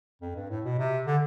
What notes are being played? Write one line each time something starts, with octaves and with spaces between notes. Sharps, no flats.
F2
G2
A2
B2
C3
D3